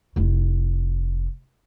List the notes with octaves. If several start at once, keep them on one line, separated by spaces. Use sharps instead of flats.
F1 E4